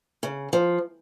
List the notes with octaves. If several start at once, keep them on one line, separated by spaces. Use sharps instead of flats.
C#3
F3